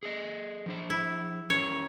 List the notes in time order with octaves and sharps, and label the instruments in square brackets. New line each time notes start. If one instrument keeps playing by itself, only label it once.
[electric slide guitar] G#4 A4 D#5
F3 D4 C5
[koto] E4
[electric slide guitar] C#4 G4 A#4 [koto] C#5